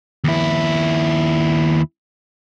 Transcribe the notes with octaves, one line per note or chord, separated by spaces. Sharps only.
D#2 E4